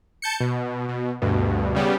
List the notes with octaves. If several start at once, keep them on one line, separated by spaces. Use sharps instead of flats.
A5 G6 C#7
B2
B2
D2 G2 B2
C#3 G3 B3 G4